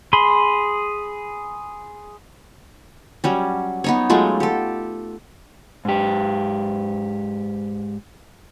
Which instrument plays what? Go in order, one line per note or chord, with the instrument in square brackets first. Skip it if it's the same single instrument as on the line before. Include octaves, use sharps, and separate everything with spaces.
[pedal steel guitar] G#4 B5 C6
[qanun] F#3 G3 C#4
B3 D#4 C#5
F#3 G#3 A3 F4
G4 A4
[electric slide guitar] G#2 G4